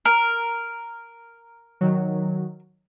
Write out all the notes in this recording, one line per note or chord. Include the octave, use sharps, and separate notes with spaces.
A#4
D#3 F#3